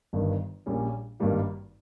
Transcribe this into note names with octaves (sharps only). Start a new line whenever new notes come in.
G1 G2 D#3
A#1 A#2 G3 C#4
G#1 G2 D#3 G3 A#3